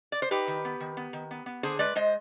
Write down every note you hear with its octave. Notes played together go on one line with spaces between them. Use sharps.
D5
C5
D#4 G4 B4
D#3
B3
D#3
B3
D#3
B3
B3
D3 G#4 C5
G#3 B4 D5
G#3 C5 D#5